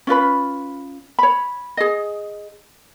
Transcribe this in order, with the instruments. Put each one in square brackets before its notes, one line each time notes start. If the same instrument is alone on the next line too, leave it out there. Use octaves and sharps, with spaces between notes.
[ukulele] C#4 F4 B4 B5
C#5 B5
G#4 D#5